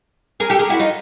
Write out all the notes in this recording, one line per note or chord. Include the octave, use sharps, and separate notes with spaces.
G#4 A#4
G4 A4
G#4 A#4
E4 F#4
D#4 F4